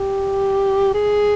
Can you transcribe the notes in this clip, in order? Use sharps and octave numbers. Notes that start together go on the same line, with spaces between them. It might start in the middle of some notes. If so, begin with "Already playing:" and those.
Already playing: G4
G#4